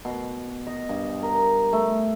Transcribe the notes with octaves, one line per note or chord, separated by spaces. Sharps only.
B2
D#5
G2
A#4
A3